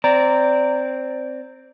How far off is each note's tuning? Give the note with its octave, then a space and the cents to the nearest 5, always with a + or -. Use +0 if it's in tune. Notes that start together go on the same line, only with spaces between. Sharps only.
C4 +0 D5 -15 A#5 -15